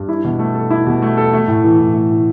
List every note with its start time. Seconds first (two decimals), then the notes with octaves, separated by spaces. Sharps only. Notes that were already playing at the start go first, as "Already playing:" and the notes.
Already playing: G2
0.09 E4
0.24 B2
0.39 A3
0.55 A4
0.70 E4
0.87 B2
1.02 A3
1.17 A4
1.33 A3
1.48 A2
1.64 E3
1.79 A2
1.94 A3
2.10 A2